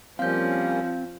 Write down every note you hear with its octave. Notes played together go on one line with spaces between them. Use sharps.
F3 G3 A#3 C4 C#4 F5 G6